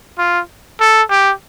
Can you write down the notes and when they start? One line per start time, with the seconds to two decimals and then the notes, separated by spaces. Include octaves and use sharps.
0.18 F4
0.81 A4
1.10 G4